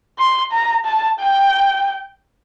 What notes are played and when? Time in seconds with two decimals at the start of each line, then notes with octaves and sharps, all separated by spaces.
0.19 C6
0.52 A#5
0.86 A5
1.20 G5